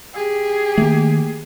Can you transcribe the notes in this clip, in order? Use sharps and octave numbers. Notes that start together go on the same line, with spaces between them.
G4 G#4
D#3 A3 A#3